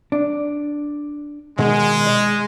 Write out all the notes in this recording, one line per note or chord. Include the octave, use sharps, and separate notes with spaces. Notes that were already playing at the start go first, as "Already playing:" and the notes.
D4
B2 D#3 G#3
D#5